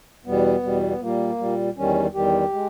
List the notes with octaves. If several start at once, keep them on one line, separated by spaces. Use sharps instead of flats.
E2 B2 G3 B3
E2 B2 G3
B3
A#2 G3 A#3
A#2 G3
E2 D#3 G3 C#4
E2 D#3 G3 G4
G#3